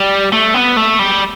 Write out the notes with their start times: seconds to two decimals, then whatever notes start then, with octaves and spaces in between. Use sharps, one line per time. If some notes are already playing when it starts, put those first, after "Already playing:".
Already playing: G3
0.32 A3
0.54 B3
0.77 A3
0.99 G3